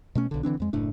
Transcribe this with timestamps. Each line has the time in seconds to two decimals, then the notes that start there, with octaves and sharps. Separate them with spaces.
0.15 B2 A3 C#4
0.31 B1 D3
0.43 D3 E3 C4 D4
0.60 F2 G#3
0.73 F#1 A2 A3 D4